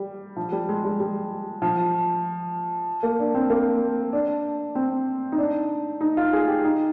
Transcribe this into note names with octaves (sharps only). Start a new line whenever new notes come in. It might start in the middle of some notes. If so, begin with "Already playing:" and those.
Already playing: G3
F3
G3
G#3
G3
G3
F3
A#3
D4
C4
A#3
D4
C4
D#4
D4
D#4
F4
G#4
G4
D#4